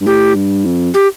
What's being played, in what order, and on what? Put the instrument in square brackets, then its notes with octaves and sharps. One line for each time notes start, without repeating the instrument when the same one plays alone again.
[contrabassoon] G2
[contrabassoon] A2 [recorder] G4
[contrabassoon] G2
F2
[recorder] G4